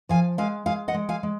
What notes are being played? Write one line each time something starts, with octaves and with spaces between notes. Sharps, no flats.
F3 F5 G#5
G#3 F5 G#5
G#3 F5 G#5
D#5 F#5
G#3
F5 G#5
G#3